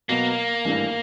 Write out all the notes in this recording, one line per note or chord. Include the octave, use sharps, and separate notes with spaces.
B2 F#3 A#3 B3
G#1 G2 E3 A3 D4